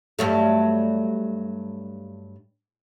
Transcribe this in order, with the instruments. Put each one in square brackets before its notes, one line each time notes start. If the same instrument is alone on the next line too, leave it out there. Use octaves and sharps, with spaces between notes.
[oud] G2 F#3 A3